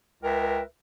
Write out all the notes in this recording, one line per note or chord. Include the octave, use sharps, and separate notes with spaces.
C#2 A#4 B4 E5 G5